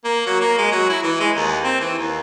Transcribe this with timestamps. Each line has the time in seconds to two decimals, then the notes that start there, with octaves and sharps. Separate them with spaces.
0.04 A#3
0.26 F#3
0.40 A#3
0.58 G#3
0.71 F#3
0.89 E4
1.03 E3
1.20 G#3
1.36 D#2
1.63 C4
1.80 E3
1.98 D#2